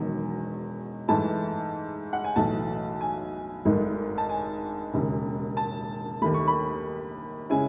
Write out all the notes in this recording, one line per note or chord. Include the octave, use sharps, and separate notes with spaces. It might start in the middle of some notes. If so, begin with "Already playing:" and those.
Already playing: E1 E2 D#3 F#3
G#2 E3 A3 E4 A5
F#5
G#5
B1 A2 E3 A3 A5
G#5
G#1 G#2 D#3 A3 D#4
A5
G#5
E1 D#2 C#3
A5
D#2 D#3 A3 B5
C#6
B5
C#3 G#3 C#4 E4 G#5